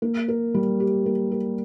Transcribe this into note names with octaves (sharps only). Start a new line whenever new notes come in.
A#3
A#4
G3
G4
A#3
A#4